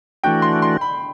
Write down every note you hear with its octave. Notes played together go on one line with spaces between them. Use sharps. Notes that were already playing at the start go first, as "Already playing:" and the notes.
E3 A3 D4 F#4 G5
C6
C6
B5